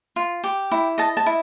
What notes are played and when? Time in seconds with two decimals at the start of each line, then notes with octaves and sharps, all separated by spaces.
0.16 F4
0.44 G4
0.72 E4
0.98 D#5 A5
1.17 A5
1.26 E4